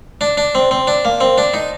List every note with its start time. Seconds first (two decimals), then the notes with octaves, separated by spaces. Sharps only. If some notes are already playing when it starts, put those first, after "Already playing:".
0.21 D4
0.37 D4
0.55 C4
0.71 C4
0.87 D4
1.05 A#3
1.21 C4
1.38 D4
1.54 D#4